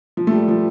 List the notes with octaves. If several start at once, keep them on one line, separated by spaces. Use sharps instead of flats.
F3
A3
G3
F3